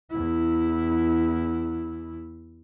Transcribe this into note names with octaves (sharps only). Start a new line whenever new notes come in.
E2 E4